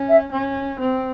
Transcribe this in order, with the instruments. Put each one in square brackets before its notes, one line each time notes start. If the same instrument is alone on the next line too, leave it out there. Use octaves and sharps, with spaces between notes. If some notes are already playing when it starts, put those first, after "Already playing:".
Already playing: [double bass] C#4
[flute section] E5
[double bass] C#4
C4